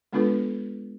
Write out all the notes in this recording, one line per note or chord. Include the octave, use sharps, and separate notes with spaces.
G#3 B3 D4 F4 A4 B4